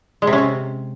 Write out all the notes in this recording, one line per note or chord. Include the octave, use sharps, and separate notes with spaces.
G#3
C3
C#4
C3